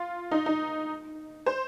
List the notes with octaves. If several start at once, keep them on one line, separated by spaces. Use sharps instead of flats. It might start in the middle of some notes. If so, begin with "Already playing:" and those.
Already playing: F4
D#4
D#4
C5